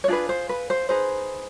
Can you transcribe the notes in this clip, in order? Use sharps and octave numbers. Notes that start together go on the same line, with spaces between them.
C#5
D4 F4 G#4 B4 D5
C5
B4
C5
D#4 G#4 B4 C5